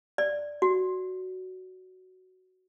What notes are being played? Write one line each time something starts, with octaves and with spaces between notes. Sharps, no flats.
D5
F#4